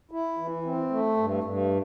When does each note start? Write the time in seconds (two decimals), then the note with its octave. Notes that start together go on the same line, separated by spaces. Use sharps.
0.11 E4
0.38 E3
0.64 C4
0.90 A3
1.17 G2
1.44 G2